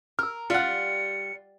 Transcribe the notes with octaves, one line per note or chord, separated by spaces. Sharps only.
A#4 E6 F6
G3 F4 F#5 C#7